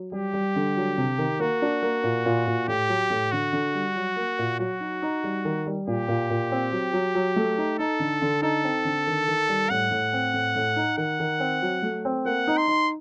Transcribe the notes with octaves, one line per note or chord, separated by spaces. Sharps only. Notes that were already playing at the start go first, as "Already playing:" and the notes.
Already playing: F#3
G3 G4
G3
D3
F#3
C3
D#3
A#3 F#4
D4
A#3
A#2
A#2
A#2
A2 G4
F#3
A2
D3 F#4
D3
G3
F#3
A#3
A#2
F#3 F#4
D#4
D#4
G3
D#3
G3
A#2 G4
A#2
A#2
C4
F#3
F#3
F#3
A3
D#4
D#4 A4
D3
D3
D#4 A4
C4
D3
D#3
D#3
G3
A2 F#5
A2
C4
A2
A2
D#4
D#3 F#5
D#3
C4
F#3
A3
C4
A#3 F#5
D#4
C6
D#4